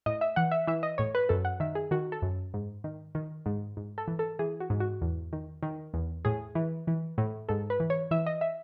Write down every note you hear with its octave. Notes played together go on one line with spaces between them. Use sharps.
A2 D#5
E5
E3 F#5
E5
E3 E5
D#5
A2 C#5
B4
F#2 A4
F#5
D#3 E5
G#4
D#3 F#4
A4
F#2
G#2
D#3
D#3
G#2
G#2
A4
E3
A4
E3 G#4
F#4
G#2
F#4
E2
D#3
D#3
E2
A2 G#4
E3
E3
A2
G#2 A4
B4
E3
C#5
E3 E5
D#5
E5